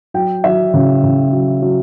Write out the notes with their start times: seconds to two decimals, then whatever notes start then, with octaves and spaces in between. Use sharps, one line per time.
0.14 F#3 G5
0.44 F#3 E5
0.74 C#3
1.03 C#3
1.32 F#3
1.62 F#3